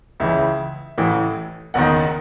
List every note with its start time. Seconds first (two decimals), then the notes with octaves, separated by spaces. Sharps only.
0.20 C#2 C#3 E3 E5
0.98 A1 A2 E3
1.74 F#1 E2 D#3 F#5